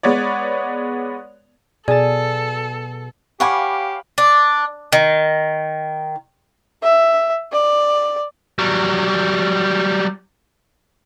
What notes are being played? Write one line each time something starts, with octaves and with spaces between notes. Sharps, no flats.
G#3 B3 C#5 D5
B2 G#4 A4 D5 A5
G4 C#5 F5 F#5 G#5 B5 D6
D4
D#3
E5
D5
F#3 G3